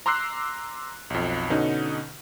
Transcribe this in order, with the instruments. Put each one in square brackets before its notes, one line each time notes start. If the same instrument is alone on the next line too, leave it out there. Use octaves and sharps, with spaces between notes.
[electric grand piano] A#5 C6 D6 E6 F#6 C7
B1 F2
B2 D3 C#4 D#4